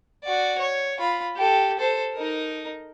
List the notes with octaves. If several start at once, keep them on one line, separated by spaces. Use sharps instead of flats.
F#4 D5
C#5
F4 B5
G4 A4
A4 C5
D#4 A#4